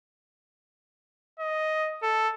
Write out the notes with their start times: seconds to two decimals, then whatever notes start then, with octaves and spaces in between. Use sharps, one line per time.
1.40 D#5
2.03 A4